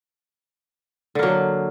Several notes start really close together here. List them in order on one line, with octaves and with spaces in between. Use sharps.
D3 A#3 F#3